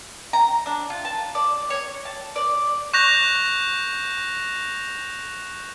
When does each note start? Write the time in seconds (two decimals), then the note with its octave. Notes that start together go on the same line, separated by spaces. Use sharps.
0.33 A#5
0.66 D4
0.90 F4
1.05 A5
1.35 D5
1.70 C#5
2.05 A5
2.36 D5
2.94 C#6 F#6 G6 A#6 F7